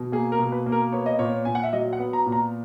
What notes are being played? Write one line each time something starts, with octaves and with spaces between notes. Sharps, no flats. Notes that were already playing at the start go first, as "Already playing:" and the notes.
Already playing: B2
A#3 G#4
A#4
B2
B4
A#3
A#4
B3 C#5
D#5
A#2 C#5
A#2 G#5
F#5
E5
F#3 D#5
F#5
B3
A#5
A#2
A#5